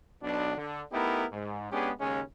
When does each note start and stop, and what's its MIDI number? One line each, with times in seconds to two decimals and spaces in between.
0.22 0.56 35
0.22 0.56 47
0.22 0.56 62
0.57 0.81 50
0.92 1.25 57
0.92 1.25 59
0.92 1.25 63
0.92 1.25 64
0.92 1.25 67
0.92 1.25 70
1.32 1.70 44
1.71 1.91 56
1.71 1.91 59
1.71 1.91 61
1.71 1.91 62
1.71 1.91 67
1.71 1.91 68
2.00 2.22 39
2.00 2.22 49
2.00 2.22 56
2.00 2.22 61